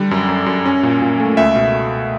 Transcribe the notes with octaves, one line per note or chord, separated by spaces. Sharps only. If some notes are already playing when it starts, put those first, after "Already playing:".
Already playing: D3 G3
F#2
F#2
F#2
C#4
A#2
A#2
A3
C#2 E5
B2